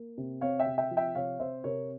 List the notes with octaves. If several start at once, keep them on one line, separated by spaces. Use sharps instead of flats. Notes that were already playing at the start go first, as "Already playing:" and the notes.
Already playing: A#3
C3
C4 C#5 F5
E5 G5
C3
E5 G5
F3
E5 G5
C3 C#5 F5
C4 C5 E5
C3 A#4 C#5